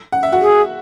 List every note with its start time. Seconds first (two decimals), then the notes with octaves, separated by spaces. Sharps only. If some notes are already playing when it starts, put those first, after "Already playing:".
0.12 F#5
0.23 E5
0.32 F#4 F#5
0.41 G#4